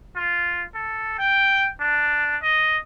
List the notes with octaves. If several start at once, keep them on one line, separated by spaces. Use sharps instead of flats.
F4
A4
G5
D4
D#5